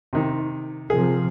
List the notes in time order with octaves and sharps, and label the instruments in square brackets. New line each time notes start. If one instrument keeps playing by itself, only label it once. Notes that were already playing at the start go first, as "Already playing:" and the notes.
[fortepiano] C3 D#3
[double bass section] C3 F3 [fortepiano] G#4